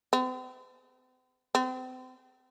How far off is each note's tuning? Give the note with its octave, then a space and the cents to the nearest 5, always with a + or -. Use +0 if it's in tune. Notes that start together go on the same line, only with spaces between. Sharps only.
C4 -45
C4 -35